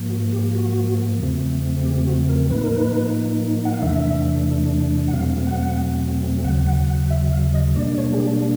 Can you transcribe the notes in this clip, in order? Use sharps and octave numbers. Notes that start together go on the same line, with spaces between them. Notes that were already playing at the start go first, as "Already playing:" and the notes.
Already playing: G#2 F3 A#3
F#4
G4
F#4
E2 C#3 F3 A3 C4
G4
F#4
A#4
A2 F3 A#3 D#4 B4
A#4
B4
F#5
F5
E2 C3 E3 A3 D4 E5
F#5
E2 B2 F#3 A3 C4 F5
F#5
D#2 C#3 F#3 F#5
F#5
F#5
E5
F5
D#5
B2 G3 A#3 D4 D5
C#5
G#4
G4